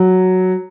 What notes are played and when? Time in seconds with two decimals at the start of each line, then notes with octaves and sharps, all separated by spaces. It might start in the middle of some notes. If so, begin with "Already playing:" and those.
Already playing: F#3